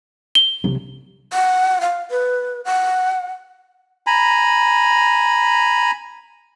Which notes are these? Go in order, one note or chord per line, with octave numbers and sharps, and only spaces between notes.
G7
C2 F#3
F#5
F5
B4
F#5
G#5 A#5 B5